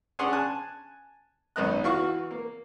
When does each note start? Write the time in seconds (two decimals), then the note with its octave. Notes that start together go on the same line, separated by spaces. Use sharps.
0.19 C#4 D4 G#4 F#5 C6
0.33 G#5 A5 F#6
1.56 G#1 F#2 B3 D#5 F#6
1.84 E3 F#4 F5 C#6
2.31 A#3